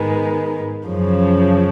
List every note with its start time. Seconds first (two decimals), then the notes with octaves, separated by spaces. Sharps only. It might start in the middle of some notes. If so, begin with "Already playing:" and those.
Already playing: G#2 D#3 G#3 B3
0.87 F#2 C#3 F3